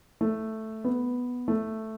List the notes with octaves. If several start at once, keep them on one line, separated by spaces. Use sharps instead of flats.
A3
B3
A3